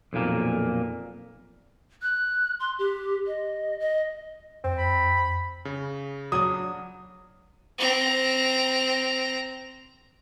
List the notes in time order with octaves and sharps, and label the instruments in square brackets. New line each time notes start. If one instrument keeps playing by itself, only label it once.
[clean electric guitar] B1 F2 A#2 A#3
[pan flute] F#6
C6
G4
D#5
D#5
[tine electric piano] F2 [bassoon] C4
[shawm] B5
[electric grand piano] C#3
[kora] F#3 D4 [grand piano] D#6
[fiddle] C4 A#5